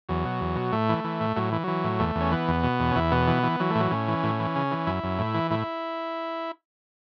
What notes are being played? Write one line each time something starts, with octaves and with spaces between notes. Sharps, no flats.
E2 F#3
B2
E2
B2
A2 A3
E3
E3
A2
A2 F#3
E3
E3 F#3
A2
E2 A3
E2
C#4
E3 B3
E2
B2
E2
C#4
E2 E4
B2 B3
E3
E3
E3 F#3
A3
A2 F#3
A2 C#4
E3
A2
E3
C#3
E3
F#2 E4
F#2
A2
E3
A2 E4